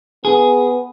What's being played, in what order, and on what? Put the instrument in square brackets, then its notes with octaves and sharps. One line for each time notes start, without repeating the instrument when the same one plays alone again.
[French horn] B3 [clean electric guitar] G#4